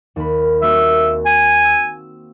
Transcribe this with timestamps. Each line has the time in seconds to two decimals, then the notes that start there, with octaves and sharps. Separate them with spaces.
0.16 D#2 B5
0.62 A#3 C4 F#4 E5
1.26 G#5
1.64 E6